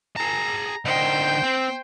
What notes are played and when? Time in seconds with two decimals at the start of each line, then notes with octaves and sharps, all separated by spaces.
0.16 G#4 A5 A#5
0.85 D3 D#4 C5 G5
1.43 C4